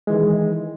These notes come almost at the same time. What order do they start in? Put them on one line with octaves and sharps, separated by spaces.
G#3 E3 D#3